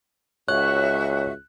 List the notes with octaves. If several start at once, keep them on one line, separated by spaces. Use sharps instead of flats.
C#2 F#4 C#5 E5 F#6